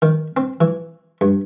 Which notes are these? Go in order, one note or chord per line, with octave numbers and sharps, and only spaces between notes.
D#3
C4
E3
G2